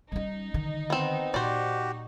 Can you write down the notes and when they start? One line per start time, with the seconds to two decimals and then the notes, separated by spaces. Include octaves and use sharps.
0.12 G3 C#4 D#4
0.54 D3 D#3
0.90 B3 C4
1.34 A#2 F#4 G4 C5 D5